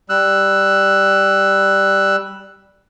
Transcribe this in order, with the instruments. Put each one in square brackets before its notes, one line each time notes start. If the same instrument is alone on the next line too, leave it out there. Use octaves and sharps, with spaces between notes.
[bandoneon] G3 E6 F#6